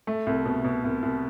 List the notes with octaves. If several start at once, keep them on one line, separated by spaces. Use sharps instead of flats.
A3
C2
B2
B2
C2
C2